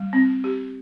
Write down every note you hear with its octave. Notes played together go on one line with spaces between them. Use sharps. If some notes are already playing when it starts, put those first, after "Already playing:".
Already playing: G3
C4
G4